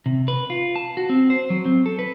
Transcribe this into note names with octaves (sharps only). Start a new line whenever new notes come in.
C3
B4
F4
A5
F#4
C4
C5
F#3
C4
A4
B4